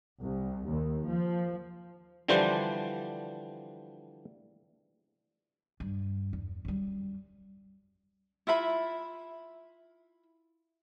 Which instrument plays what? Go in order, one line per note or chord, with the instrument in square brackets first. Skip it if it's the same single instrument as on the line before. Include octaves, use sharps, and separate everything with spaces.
[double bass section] C2
D#2
F3
[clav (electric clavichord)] D3 E3 F3 G3 D4 C5
[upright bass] G2
E2
F#2 G3
[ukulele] E4 F4 E5 B5